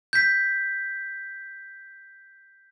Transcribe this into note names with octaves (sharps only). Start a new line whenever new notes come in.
G6 B6